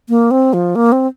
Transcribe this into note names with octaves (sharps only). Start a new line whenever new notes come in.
A#3
C4
F3
A#3
C4